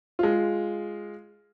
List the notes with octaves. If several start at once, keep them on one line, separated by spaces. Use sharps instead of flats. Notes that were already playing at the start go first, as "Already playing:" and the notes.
G#3 F4